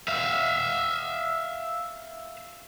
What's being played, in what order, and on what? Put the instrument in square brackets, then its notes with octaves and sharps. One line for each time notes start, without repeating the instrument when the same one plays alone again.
[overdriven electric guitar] E5 F5